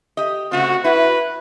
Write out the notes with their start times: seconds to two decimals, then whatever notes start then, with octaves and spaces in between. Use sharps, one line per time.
0.17 G4 D#5
0.52 C#3 A3 C4 F#4
0.84 E4 F#4 B4